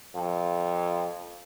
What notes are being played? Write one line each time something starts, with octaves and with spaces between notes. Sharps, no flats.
F2